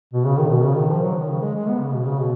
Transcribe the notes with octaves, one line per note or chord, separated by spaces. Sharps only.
B2
C#3
D#3
B2
C#3
D#3
F3
F#3
D#3
C#3
G#3
G#3
B3
C#3
B2
C#3
B2